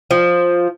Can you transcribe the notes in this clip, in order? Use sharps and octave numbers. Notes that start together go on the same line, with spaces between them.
F3